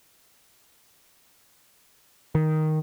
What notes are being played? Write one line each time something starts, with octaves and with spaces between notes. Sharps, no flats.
D#3